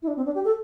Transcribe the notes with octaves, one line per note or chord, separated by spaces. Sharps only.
E4
D4
C4
D4
G4
A4